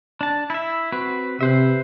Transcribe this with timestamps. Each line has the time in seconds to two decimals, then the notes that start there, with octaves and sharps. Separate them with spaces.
0.21 D4 A5
0.50 E4 E5
0.92 C4 F#4 B4
1.41 C3 B4 C5 E5